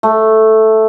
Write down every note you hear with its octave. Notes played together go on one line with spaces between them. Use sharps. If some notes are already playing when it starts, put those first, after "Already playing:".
A3